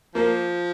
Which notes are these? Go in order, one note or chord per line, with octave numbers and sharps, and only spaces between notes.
F3 A#3